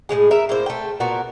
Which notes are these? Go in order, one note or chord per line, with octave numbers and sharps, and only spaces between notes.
A2 F3 G#3 G#4
A#4 E5
A2 A#3 C5
A3 G5
A#2 B3 F#4 A#4